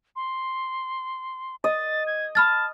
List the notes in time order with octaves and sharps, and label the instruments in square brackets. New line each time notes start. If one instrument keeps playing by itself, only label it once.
[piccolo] C6
[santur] D#5 [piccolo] A6
[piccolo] G#6
[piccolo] A5 [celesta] B5 F6 A6